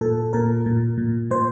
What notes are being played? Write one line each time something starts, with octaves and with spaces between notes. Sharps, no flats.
A#2 A4
A#2 A#4
A#2
A#2
A#2 C5